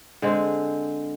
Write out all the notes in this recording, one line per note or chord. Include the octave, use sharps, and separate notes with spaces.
D3 G#3 C4